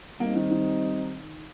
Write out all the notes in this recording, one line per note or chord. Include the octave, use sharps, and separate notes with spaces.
G3 A#3 C4 D#4
D#3
D#3